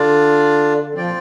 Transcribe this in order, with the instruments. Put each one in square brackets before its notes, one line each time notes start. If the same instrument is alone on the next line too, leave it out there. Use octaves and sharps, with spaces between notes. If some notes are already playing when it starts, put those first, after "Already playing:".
Already playing: [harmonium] D3 [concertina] D4 F4 D5
[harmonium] D3
[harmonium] F3 [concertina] C4 F4 D5 G5
[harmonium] A#2